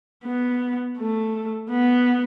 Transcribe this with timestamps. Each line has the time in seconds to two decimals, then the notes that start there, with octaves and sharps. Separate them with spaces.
0.24 B3
0.98 A3
1.71 B3